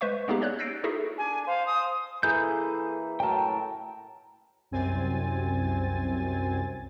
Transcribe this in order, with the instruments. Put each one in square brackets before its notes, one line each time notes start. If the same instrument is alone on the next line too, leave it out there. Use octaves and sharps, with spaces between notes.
[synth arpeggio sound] G#3 B4 C5 E5 C#6
G#3 A#3 B3 D#4 G4 G#4
C#4 C#5 D5 F#6
E6 G6 A6 A#6 C7 D7
D#4 E4 F#4 G#4 A4 E5
[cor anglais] D4 [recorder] G#5
[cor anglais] C5 [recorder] F5
[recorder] D#6
[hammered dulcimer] E3 A#3 E4 [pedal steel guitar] G#4 A4 G6
[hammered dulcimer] A2 F#3 A#4 [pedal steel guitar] G5 A5
[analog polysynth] C2 F#2 C4 G#5 A6